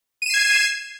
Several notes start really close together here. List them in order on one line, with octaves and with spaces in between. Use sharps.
D#7 E7 C7 G#6